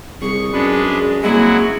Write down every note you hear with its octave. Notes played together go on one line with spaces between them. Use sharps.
C2 G#4 C#6
F#2 G#3 D4 B4
C2 F#3 G#3 A#3 E4 F#4